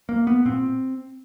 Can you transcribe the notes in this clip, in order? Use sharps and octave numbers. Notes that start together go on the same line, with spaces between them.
A#3
B3
A#2 C4